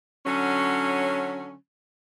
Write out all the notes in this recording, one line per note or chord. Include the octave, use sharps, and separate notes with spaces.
D3 F#3 C#4